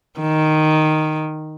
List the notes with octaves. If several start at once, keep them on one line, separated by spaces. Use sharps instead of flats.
D#3